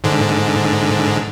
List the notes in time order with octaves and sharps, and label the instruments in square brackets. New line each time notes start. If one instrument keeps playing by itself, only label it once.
[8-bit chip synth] G#2 D3